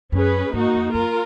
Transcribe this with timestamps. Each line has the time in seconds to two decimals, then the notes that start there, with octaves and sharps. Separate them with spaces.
0.12 F#2 C#4 G#4 B4
0.53 G#2 A#3 D#4 F#4
0.74 F2
0.93 F#2 F4 A#4